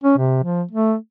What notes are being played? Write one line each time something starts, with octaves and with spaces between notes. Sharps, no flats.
C#4
C3
F3
A3